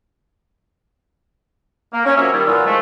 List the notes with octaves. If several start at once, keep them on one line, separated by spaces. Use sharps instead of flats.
A#3
C#4
F3 F#3 A#3 C#4 C#5 E5
D#3 G3
A#2 E3 F#3 F4 D#6 E6
D#3 F3 G#3 A3